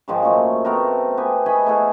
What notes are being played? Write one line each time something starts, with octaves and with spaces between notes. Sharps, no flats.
G#2 D#3 F3 G#3
F#2 A#2 A3 C#5
A3 B3 C4 A#4
B3 G4 G#5
A3 G#4 D#5 B5
A3 E4 G#4 F#5